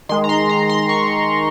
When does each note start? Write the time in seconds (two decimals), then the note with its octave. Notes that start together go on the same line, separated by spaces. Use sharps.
0.09 D#3 G#3 C6
0.24 A#5
0.29 C6
0.49 A#5
0.70 C6
0.89 C#6